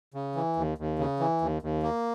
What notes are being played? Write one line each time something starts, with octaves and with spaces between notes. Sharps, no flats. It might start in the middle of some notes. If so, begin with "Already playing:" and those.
C#3
E3
D#2
D#2
C#3
E3
D#2
D#2
A#3